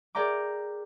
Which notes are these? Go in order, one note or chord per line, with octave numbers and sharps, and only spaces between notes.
G#4 A#4 D5 G5 A#5 D6